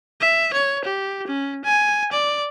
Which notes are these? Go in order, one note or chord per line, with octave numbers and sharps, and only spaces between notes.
E5
C#5
G4
C#4
G#5
D5